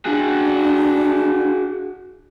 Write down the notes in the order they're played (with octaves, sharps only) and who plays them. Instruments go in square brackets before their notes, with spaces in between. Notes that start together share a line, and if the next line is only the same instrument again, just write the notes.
[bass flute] D4 [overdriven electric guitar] F#4 G#4